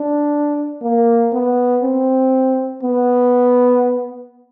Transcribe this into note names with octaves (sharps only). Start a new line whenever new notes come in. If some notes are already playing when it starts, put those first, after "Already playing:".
Already playing: D4
A#3
B3
C4
B3